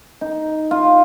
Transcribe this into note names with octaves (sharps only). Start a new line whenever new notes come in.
D#4
F4